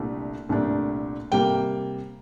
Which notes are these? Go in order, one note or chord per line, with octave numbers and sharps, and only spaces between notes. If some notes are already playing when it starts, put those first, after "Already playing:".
Already playing: C2 A#2 A3 D4
C2 A#2 A3 D4
C3 G3 A#3 G5